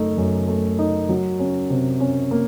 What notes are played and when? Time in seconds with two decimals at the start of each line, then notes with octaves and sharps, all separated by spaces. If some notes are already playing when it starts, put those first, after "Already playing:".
Already playing: F#2 A3 D#4
0.18 F#2
0.48 A3
0.78 D#4
1.09 F#3
1.39 C#4
1.70 C3
2.00 C#4
2.31 A#3